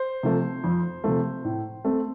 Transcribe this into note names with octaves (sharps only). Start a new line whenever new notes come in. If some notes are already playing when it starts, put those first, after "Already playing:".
Already playing: C5
C3 F3 A3
F2
C3 F3 A3
A2
A3 C4